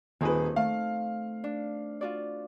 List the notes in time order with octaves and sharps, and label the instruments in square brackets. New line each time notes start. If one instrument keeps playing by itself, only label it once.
[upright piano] D#1 G#4 B4 [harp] D#3 C4
[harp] A3 [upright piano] F5
[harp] D4
F4 F#4 D5